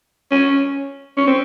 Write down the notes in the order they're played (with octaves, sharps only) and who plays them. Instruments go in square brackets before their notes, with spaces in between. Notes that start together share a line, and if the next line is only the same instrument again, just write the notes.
[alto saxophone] C#4
C#4
C4